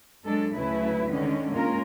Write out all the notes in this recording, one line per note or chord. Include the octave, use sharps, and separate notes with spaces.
F#3 G#3 D4 A4
D2 C#3 F#3 A3 E4 B4
D3 D#3 G#3 C#4
G#3 A#3 C#4 F4 A#4